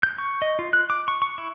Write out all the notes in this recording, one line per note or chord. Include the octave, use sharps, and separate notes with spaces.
G6
C#6
D#5
F4
F#6
D6
C#6
C#6
E4